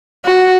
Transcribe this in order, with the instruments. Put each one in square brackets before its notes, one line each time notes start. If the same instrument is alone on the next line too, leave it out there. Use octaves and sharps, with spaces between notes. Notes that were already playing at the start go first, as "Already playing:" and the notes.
[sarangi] F#4